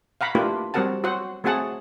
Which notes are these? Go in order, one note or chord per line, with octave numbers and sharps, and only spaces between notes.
F5 F#5 A#5 B5
A3 A#3 D4 F4 G4 B4
G3 C4 F#4 A#4 F#5 A5
F#4 C5 F#5
A3 C4 F#4 G#4 F#5 A5